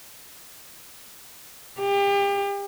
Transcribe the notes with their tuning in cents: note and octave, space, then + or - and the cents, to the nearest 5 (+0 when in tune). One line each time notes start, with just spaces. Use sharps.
G4 +35